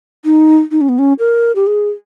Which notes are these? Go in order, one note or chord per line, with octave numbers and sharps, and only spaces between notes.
D#4
D#4
C#4
B3
C#4
A#4
G4
G#4